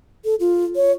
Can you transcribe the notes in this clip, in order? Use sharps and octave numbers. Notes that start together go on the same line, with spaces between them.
A4
F4
C#5